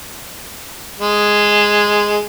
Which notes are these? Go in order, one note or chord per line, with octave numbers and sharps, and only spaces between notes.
G#3